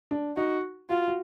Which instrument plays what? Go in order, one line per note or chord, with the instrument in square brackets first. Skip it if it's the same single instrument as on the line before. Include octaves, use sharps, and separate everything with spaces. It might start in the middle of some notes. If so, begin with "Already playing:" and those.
[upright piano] D4
[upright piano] D#4 [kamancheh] F#4
[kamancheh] F4 [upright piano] F#4
[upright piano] F#4